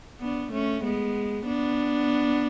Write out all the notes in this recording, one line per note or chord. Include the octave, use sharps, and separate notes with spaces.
B3 D4
A3 C#4
G#3 B3
B3 D4